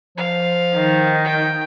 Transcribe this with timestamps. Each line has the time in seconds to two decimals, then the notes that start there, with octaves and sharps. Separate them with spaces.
0.17 F3 F5
0.76 D#3
1.24 G5